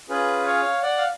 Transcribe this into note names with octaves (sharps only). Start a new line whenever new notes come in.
C#4 F4 G#4 B4
C#5 F5
D5 F#5
F5